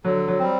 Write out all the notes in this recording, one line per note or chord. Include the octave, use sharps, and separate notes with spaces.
D3 F#3
F#3
G3 C4